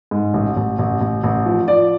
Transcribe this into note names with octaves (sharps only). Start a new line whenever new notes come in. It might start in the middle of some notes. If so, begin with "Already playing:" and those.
G#2
A1
A1
A1
A1
A1
F3
F3 D5